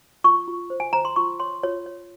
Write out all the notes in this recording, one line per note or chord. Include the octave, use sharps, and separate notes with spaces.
F4 C#6
F4
C5
G#5
C5 A#5
C6
F4 C#6
C#5 C6
F4 C#5
C#5